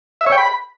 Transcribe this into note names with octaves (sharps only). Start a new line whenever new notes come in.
E5
C#5
G5
B5